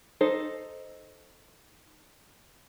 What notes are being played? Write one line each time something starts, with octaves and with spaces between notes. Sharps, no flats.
D#4 A4 C5